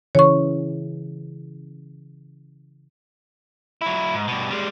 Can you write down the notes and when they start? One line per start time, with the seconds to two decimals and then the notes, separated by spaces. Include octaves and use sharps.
0.15 C#3 E3 C#5 C#6
3.81 F#3 E4
4.14 G#2
4.27 G2 B2
4.50 G3 G#3